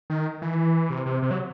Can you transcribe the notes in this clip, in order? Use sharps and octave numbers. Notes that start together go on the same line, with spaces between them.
D#3
E3
C3
C3
C3
F#3